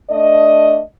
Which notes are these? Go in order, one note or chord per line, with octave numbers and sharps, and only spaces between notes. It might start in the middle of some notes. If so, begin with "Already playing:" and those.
A3 D4 D5 D#5